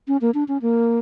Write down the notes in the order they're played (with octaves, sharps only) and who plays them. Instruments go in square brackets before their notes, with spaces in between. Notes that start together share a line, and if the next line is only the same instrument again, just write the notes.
[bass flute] C#4
A#3
D4
C#4
A#3